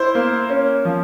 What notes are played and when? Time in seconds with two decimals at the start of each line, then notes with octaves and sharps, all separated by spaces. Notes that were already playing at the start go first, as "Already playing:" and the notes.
Already playing: E4 C5
0.15 A#3
0.50 C#4
0.85 F3